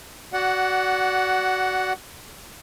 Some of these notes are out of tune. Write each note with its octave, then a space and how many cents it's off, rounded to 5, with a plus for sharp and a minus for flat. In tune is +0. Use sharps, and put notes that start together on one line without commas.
F#4 +15 D5 -20 F#5 +0